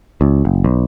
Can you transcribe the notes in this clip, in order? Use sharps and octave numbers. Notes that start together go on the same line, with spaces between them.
C#2
F#1
B1